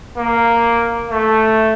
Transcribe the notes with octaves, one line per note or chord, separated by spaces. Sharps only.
A#3
A3